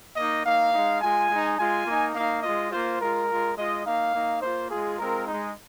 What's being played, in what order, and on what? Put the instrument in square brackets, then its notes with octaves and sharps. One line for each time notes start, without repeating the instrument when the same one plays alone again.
[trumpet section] A#3 D#4 D#5
A#3 D#4 F5
G#3 D#4
G#3 F4 G#5
G#3 D#4
G#3 F4 G#5
A#3 D#4
A#3 D#4 F5
G#3 F4 D#5
A#3 F4 C5
G#3 F4 A#4
G#3 F4
G#3 F4 D#5
A#3 D#4 F5
A#3 D#4
A#3 F4 C5
G#3 F4 G#4
G#3 C4 F4 A#4
D#4
G#3